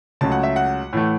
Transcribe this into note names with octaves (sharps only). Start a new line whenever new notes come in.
C#2 C#3 F#3 A3 A5
F#5
E5
F#5
A2 E3 A3